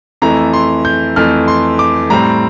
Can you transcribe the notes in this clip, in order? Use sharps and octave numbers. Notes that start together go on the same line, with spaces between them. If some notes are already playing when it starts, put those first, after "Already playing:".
F2 E3 A3 A#5
C6
G6
F2 E3 A3 F6
C6
D6
A2 G3 C4 A#5